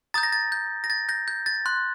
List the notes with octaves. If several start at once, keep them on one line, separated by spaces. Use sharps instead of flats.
A#5 D#6 G6 A6
A#6
A6
G6
A#6
A6
G6 A#6
G6
A6
C6 F#6